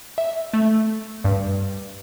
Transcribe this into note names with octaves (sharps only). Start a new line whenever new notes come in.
E5
A3
G2